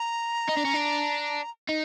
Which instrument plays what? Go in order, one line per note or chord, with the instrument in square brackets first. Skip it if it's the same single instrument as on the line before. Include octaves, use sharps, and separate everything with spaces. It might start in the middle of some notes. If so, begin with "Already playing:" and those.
Already playing: [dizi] A#5
[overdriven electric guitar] D#4
D4
C#4
D4
D#4